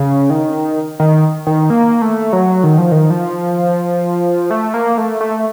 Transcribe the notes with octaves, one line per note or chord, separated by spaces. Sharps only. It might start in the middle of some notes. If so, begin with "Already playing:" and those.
Already playing: C#3
D#3
D#3
D#3
A#3
A3
F#3
D#3
F3
D#3
F3
A3
A#3
A3
A3